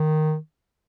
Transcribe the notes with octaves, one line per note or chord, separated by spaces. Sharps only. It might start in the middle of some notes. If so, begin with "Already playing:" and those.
Already playing: D#3